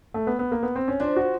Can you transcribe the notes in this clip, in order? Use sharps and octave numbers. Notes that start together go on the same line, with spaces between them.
A3
B3
B3
A#3
B3
C4
C#4
F3 D4
F#4